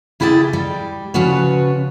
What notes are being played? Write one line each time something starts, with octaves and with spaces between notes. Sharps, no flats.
C#3 E4 G4 G#4 E5 A5
G3
C#3 F3 F#4 B4 C#5